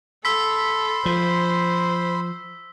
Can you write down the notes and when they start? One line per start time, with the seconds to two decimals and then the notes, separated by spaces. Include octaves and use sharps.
0.25 A4 B5 C6 E6 B6
1.06 F3 C5